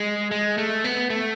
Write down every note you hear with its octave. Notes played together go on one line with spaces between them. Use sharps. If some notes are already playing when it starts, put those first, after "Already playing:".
Already playing: G#3
G#3
A3
B3
A3